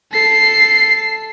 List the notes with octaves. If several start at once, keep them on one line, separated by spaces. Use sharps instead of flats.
A4 C7